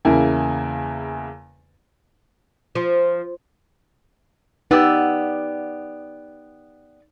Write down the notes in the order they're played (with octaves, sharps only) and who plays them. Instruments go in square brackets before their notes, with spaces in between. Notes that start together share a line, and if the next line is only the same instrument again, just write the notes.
[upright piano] E2 C#3 A#3 E4 G#5 A5
[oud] F3
[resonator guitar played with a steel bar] B3 G4 [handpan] D#4 [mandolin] D5 E6